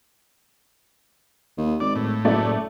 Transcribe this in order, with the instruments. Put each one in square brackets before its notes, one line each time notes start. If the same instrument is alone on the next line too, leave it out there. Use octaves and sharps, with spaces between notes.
[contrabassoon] D#2
[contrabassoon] G#1 [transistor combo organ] D5
[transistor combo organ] A2
[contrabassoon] F#1 [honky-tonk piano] F#3 A3 D5